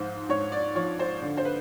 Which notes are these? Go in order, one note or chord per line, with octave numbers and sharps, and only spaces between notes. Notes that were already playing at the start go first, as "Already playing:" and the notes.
Already playing: G#2 F3 C5
G#2 C#5
D5
F3 C#5
C5
D3
C5
B4